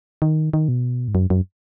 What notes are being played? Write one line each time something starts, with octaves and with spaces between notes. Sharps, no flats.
D#3
D#3
B2
G#2
F#2
F#2